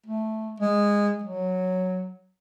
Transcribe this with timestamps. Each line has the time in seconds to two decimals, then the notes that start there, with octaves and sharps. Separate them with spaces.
0.06 A3
0.60 G#3
1.24 F#3